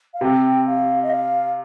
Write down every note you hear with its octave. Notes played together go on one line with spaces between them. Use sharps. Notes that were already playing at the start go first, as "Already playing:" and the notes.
F5
C3 G5
F5
D#5
F5